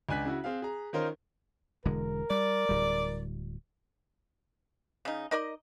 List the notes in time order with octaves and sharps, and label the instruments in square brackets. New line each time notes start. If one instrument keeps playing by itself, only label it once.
[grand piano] C#2 D4 G#5 F#6 B6
C#3 E4 F#4
C4 G#4 F5
G#4 A#5
D#3 C#4 D#4 F4 A#4 C5
[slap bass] E1 D3 G#3 [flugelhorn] A#4
[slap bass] G3 [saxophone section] D5
[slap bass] D1 G3
[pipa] C#3 D#4
D#4 A#4 D5 D#5